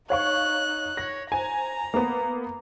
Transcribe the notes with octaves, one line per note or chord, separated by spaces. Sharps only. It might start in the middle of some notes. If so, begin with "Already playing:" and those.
D#4 C#5 F5 C#6 F#6
C#5 A#6
C5 G#5 A#5
A#3 B3